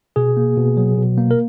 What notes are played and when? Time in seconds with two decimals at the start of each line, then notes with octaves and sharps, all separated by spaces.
0.16 B2 G#4
0.37 A#3
0.57 B2
0.77 F#3
0.97 B2
1.18 A#3
1.31 A#4